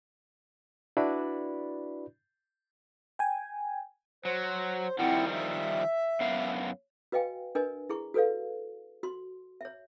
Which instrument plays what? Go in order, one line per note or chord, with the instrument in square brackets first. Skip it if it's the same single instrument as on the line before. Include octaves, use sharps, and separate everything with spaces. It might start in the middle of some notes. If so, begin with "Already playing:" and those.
[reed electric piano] D4 E4 F#4 B4 D5 B5
[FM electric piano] G5 G#5
[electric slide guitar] F#3 [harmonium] C5
[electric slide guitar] D#3 F3 G3 [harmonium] C4 E4 F#5
[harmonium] E5
[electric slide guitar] F#2 B3 F5
[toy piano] F#4 B4 D#5 F5 G5 G#5
D4 A#4 B4 D#5 G#5
E4 G#4 C#6
F#4 A4 B4 D5 F5
F#4 C6
C#5 E5